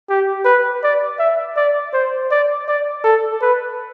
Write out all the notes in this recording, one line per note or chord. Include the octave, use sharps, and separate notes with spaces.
G4
B4
D5
E5
D5
C5
D5
D5
A4
B4